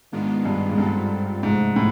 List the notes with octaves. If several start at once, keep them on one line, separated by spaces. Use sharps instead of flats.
G#2 D#3 G#3 B3 D4 F4
G2
G#2
G2 G3 C4 F4 A4
G#2 C3 F3 A3
A2